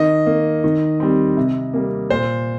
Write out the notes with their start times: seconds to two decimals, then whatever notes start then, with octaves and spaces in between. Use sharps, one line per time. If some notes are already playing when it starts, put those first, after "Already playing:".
Already playing: D#3 D#5
0.26 A#3
0.64 D#3
1.00 G3 C4
1.37 C3
1.74 G3 A#3
2.10 A#2 C5